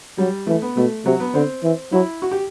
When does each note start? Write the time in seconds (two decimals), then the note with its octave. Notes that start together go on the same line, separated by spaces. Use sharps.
0.18 F#3 G3
0.47 E3 A3
0.62 B3
0.77 B2 A3
1.06 C3 F#3
1.20 B3
1.34 D3 C4
1.63 E3
1.92 F#3 E4
2.22 F#4
2.31 G4